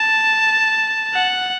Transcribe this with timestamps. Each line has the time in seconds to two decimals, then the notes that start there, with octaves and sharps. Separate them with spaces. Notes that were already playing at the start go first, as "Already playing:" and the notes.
Already playing: A5
1.14 F#5